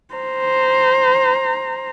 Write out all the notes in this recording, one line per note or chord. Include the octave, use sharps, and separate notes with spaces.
C5 A#5